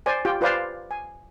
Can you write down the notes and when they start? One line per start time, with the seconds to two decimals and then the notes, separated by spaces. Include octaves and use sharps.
0.06 C5 D5 G#5
0.25 F4 G4 G5
0.41 F4 B4 C5 D5 F5
0.91 G#5